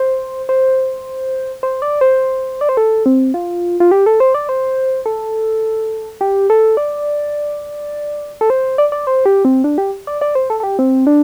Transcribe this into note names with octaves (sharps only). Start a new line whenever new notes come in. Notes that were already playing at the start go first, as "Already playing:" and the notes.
Already playing: C5
C5
C5
D5
C5
D5
C5
A4
C4
F4
F4
G4
A4
C5
D5
C5
A4
G4
A4
D5
A4
C5
D5
D5
C5
G4
C4
D4
G4
D5
D5
C5
A4
A4
G4
C4
D4